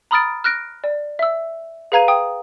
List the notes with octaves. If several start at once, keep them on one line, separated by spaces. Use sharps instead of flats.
A#5 B5 D#6 F6 A6 D7
F6 F#6 A#6 D7
D5
E5 E6
G#4 B4 F5 A#5 G#6 D#7
G5 D#6